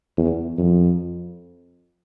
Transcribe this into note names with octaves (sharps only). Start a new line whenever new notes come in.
E2
F2